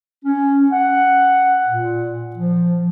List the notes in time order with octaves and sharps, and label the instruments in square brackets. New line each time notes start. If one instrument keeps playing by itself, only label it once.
[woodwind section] C#4
F#5
A#2
F3